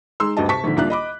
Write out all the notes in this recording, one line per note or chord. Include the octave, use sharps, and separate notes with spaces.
G#3 D#4 C6 E6
D2 G2 G4 D#5 A5
C3 A5 C#6 B6
A#1 G#2 D3
C2 A#3 D4 F4 F5 F#6
D#5 B5 D6